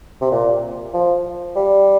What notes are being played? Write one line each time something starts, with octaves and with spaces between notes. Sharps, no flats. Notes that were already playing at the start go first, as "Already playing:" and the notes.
C3
A#2
F3
G3